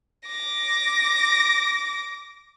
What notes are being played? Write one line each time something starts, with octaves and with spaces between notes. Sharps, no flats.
D6 A#6